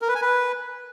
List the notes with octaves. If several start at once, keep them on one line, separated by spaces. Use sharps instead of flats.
A#4
B4
G#5
B4